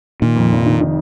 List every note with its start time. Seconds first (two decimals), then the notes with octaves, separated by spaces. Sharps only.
0.22 A#2 D#3
0.36 F2
0.52 F1
0.66 D#3
0.81 D#3